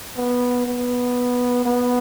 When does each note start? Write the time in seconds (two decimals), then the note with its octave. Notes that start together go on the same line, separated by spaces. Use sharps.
0.17 B3
0.67 B3
1.66 B3